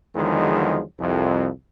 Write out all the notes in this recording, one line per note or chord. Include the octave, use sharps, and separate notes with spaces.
E2 D3 D#3 F3 F#3 G#3
C2 F2